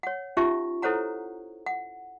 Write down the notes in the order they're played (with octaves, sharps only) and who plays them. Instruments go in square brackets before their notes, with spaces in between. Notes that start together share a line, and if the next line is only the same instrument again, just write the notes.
[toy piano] C#5 F#5
C#4 D#4 F4 G4 E5 C#6
E4 A4 C5 C#5 F#5 A#5
F#5